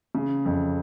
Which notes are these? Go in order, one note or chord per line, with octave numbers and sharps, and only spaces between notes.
C#3
F2